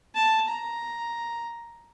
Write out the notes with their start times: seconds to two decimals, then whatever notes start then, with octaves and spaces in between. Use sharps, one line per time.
0.15 A5
0.48 A#5